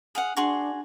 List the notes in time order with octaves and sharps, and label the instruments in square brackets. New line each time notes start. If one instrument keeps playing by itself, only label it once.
[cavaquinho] G#4 F5 F#5
[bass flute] D4 [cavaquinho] F#4 G#4 C6